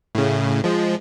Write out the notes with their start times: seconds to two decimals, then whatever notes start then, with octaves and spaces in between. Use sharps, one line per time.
0.15 A2 C#3
0.64 F3 G#3